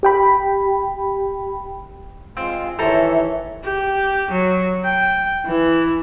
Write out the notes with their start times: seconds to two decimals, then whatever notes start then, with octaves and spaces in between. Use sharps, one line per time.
0.03 G4 G5 B5
2.37 G#3 C4 F4
2.79 D#3 E3 G4 A4 C5 C#5 E5 A#5
3.65 G4
4.31 F#3
4.85 G5
5.46 E3